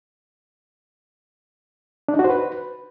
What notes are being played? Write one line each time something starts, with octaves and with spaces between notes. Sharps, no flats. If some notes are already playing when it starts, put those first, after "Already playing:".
D4
D#4
F#4
C5
B4